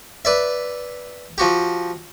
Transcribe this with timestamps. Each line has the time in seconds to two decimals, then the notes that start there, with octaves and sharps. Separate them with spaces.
0.25 B4 D5 E5
1.38 F3 F#4 G4